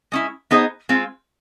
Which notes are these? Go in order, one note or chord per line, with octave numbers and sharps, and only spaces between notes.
G#3 C#4 E4
B3 D#4 G#4 C5 D#5
G#3 C4 F4